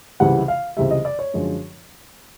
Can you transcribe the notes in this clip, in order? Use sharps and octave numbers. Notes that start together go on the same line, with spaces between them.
C#2 C3 E3 G3 F#5
F5
C#2 C3 E3 G3 E5
D#5
D5
C#5
F#2 D3 F3 G#3